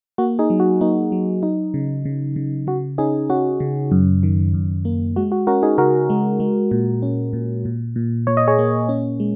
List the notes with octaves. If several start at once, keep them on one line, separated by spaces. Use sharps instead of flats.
A#3 F#4
D#4 G#4
F#3
F#4
A#3 D#4
F#3
D#4
C#3
C#3
C#3
C#3 F#4
C#4 D#4 G#4
C#4 F#4
C#3
F#2
D#3
F#2
A#3
G#3 F#4
F#4
C#4 F#4 A#4
D#4 G#4
C#3 F#4 A#4
G#3
G#3
A#2
C#4
A#2
A#2
A#2
A#2 C#5
D#5
G#4 C#5
A#3
C#4
G#3